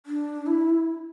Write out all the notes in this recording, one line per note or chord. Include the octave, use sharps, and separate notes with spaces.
D4
E4